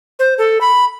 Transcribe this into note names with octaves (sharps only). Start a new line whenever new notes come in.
C5
A4
B5